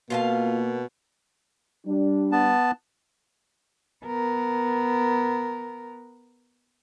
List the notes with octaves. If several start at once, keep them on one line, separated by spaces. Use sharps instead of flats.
B2 A#3 F4 F5 A5
G3 D4
B3 A5
B3 A#4